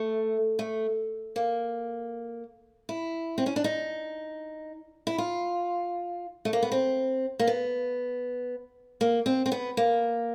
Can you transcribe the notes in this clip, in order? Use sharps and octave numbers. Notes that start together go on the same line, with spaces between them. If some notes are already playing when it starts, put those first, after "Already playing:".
Already playing: A3
A3
A#3
E4
C4
C#4
D4
D#4
E4
F4
A3
A#3
B3
C4
A#3
B3
A#3
C4
C4
B3
A#3